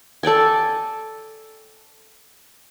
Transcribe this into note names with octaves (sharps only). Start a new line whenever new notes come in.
A4 D5 G5 G#5